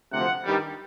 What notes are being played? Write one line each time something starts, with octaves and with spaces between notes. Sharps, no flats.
D2 C3 F3 F#5
G2 D#3 G3